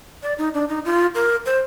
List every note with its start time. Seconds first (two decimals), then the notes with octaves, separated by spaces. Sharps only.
0.23 D5
0.38 D#4
0.54 D4
0.69 D#4
0.85 F4
1.15 A#4
1.46 C5